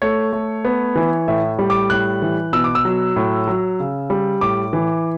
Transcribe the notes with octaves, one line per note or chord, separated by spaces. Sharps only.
A3 C#5
A3
B3
E3
A2 E5
G3
D6
A2 F#6
E3
B2 E6
D6
E6
F#3
A2
F#3
C#3
G3
A2 D6
E3